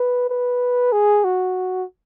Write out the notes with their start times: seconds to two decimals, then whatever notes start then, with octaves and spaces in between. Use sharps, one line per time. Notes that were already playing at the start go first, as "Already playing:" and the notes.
Already playing: B4
0.30 B4
0.92 G#4
1.24 F#4